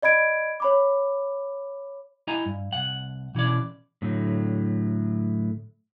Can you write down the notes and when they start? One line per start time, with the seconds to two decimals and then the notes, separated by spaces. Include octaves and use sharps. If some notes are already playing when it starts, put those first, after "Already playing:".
0.02 D5 D#5 B5 G#6 D7
0.60 C#5 B5 D6
2.27 E4 D#5 G#5 A#5
2.46 G2
2.73 C2 F#5
3.35 B2 E3 C#4 D5
4.02 A2 D3 F#3 A3